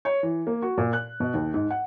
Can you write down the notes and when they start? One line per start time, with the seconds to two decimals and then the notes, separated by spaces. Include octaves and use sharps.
0.05 C#5
0.23 E3
0.47 A#3
0.62 F#4
0.78 A#2
0.93 F#6
1.20 B2
1.34 D#2
1.54 G#2
1.70 F#5